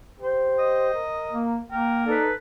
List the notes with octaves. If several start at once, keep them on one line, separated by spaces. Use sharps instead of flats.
G4 C5
D#5
A#4
A#3
A#3 A#4 G5
D#4 A4 B4 D5